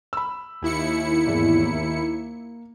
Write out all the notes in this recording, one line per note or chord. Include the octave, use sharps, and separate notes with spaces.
B5 E6
D#2 E4 C#7
G#1 E2 G#2
A#3